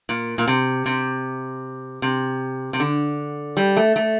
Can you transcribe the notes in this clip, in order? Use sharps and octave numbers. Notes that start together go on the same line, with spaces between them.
A#2
A#2
C3
C3
C3
C3
D3
G3
A3
A3